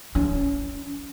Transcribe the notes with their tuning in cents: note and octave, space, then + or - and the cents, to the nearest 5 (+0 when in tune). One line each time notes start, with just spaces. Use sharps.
C#4 +25